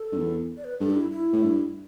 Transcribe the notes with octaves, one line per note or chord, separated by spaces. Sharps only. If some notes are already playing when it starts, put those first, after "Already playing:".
Already playing: A4
G2
E2
D5
B4
G2 A4
D4
E4
E4
A2
G2